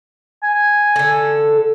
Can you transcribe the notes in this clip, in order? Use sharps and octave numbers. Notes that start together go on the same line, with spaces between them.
G#5
D3 A4